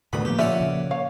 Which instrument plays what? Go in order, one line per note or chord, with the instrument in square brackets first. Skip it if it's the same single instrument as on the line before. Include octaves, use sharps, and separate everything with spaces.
[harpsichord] D2 B5 [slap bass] A2 D3 D#3 [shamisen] F#3 B3
[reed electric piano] A#2 F3 A#3 [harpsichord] G4
[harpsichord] C#4 D5 F#5 [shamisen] F4 E5
[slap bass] C#3
[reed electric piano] C#5 [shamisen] F5